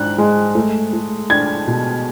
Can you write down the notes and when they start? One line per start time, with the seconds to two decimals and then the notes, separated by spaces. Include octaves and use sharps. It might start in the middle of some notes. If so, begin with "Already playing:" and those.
Already playing: G#2 D4 F#6
0.18 G#3
0.55 A3
0.93 A3
1.30 D4 G#6
1.67 B2